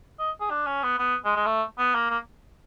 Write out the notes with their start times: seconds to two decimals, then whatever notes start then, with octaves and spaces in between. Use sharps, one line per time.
0.19 D#5
0.40 G#4
0.50 D4
0.67 C#4
0.83 B3
0.99 B3
1.25 G#3
1.36 G#3
1.46 A3
1.78 B3
1.95 A#3
2.10 A#3